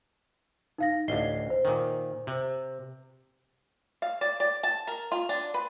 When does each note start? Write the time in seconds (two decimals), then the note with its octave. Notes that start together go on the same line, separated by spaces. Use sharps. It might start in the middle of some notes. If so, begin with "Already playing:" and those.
0.78 D#4 F5 A#6
1.08 A1 D2 D#5 C7 G7
1.50 C5
1.65 A#2 D#3
2.27 C3
4.02 F5
4.21 D5
4.40 D5
4.63 A5
4.87 A#4
5.12 F4
5.29 D4
5.54 B4